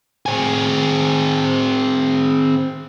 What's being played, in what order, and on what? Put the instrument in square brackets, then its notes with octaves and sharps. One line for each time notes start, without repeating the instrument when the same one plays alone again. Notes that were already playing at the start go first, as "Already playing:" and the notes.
[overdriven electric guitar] C4 G#4